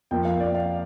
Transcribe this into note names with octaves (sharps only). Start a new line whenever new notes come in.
F2 F3 A#3 G5
F5
D5
F5